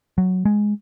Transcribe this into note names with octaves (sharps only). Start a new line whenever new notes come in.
F#3
G#3